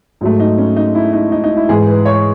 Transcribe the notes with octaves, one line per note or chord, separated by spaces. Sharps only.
G#2 F#3 A3
D#4
C#4
D#4
E4
D#4
D#4
D#4
E4
G#2 E3 G#3 G#4
B4
C#5